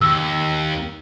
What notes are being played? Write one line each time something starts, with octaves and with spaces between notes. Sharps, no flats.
D#2 E6